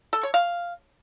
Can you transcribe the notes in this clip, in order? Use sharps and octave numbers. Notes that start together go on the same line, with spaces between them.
A4
C#5
F5